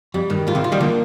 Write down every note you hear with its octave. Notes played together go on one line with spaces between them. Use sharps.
F2 G3
G2 D#3
G#2 F4
C3 D#3
F4
D#3 G3
D3 F3 A#3